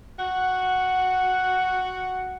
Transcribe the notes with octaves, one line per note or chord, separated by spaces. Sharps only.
F#4 F#5